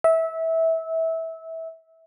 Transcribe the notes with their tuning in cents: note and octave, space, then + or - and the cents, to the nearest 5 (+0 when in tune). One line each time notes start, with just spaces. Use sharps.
E5 -20